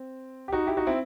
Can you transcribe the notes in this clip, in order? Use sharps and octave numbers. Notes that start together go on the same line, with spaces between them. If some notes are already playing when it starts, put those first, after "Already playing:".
Already playing: C4
G4
D#4 F#4
E4 G4
D#4 F#4
C4 E4